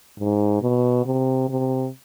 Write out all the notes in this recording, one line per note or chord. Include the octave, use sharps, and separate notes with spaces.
G#2
B2
C3
C3